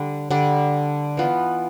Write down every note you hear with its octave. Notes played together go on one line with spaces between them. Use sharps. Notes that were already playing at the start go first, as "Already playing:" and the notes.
Already playing: D3 G3 D4
D3 G3 D4
E3 B3 F4